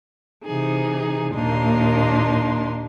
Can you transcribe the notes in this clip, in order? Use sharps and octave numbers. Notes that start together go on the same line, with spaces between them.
C3 E3 D#4 G#4
D#2 A#2 A#3 D4 D#4 C6